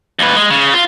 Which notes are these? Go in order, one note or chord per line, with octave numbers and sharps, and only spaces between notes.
D#2 B4
G#3
C#3
F4